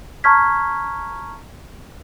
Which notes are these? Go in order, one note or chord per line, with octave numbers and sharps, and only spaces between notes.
A5 A#5 C#6 F6 G#6 B6